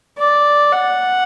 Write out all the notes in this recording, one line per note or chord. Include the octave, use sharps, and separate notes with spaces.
D5
F#5